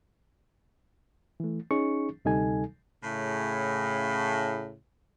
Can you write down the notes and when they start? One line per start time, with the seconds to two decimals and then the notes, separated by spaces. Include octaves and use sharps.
1.40 E3 A3
1.71 C#4 D#4 G#4 C#6
2.25 D2 C3 G3 D#4 A4 G#5
3.03 A2 C#3